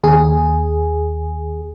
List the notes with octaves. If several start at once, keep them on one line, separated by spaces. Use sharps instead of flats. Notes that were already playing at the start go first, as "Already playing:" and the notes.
D#2 G#4